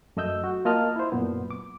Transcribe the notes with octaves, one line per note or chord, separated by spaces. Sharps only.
F#2 A3 D#5 E6 G6
F#4
A#3 F4 D#5 A5 F6
E4 C5
F#2 A#2 B3
D6